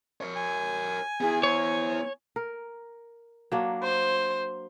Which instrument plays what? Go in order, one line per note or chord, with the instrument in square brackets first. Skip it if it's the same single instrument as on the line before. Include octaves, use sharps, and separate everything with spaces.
[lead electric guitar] A#4 C#5
[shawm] G#5
[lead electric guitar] B3 E4 [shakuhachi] G#4
[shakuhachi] C5 [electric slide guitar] C#5
[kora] A#4
F#3 A#3 D4
[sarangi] C5